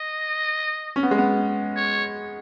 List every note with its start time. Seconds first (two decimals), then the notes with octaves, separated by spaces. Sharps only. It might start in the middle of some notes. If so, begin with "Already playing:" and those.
Already playing: D#5
0.96 C#4
1.03 B3
1.11 G#3
1.18 B3
1.77 C#5